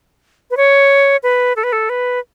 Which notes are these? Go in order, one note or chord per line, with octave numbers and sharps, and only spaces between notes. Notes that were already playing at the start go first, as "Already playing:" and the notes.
B4
C#5
B4
A4
B4
A4
B4